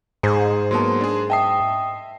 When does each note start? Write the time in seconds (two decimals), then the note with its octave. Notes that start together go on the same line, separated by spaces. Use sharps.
0.23 G#2 G#4 C5 A#5
0.71 F#3 A#3 B3 A5 C6
1.01 D4 G#4
1.30 D#5 E5 G5 A5 D#6 C7